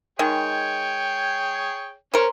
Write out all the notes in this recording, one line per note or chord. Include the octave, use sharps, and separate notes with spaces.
D#3 G#3 G#4 C#5 G5
C#4 A#4 C5